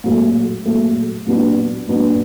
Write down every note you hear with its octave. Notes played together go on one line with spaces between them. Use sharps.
A#2 F#3 A3
A#2 F#3 A3
A#2 F#3 B3 D4 F#4
A#2 F#3 B3 D4 F#4